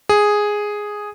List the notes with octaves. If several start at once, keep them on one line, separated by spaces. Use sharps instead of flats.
G#4